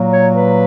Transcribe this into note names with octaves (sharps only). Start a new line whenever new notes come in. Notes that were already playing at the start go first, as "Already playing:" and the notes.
Already playing: A#2 F#3 A#3
C#5
B4